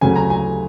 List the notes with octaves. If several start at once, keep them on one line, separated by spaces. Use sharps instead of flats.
D2 C#3 F#3 G#5
A#5
G#5